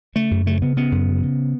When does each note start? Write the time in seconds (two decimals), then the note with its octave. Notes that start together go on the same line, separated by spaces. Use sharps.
0.16 C#3 A3
0.31 F#2
0.46 C#3 A3
0.62 C#3 B3
0.77 C#3 B3
0.92 F#2
1.08 C#3
1.23 C#3